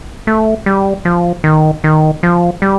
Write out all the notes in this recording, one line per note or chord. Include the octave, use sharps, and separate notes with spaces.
A3
G3
F3
D#3
D#3
F3
G3